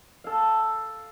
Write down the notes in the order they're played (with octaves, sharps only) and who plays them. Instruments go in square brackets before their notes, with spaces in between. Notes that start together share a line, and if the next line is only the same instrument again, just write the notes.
[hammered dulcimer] A4 F5